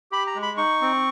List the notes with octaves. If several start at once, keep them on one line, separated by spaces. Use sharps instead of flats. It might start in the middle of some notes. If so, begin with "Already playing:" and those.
G4 B5
A#5
G#3
B5
D#4 C#6
C4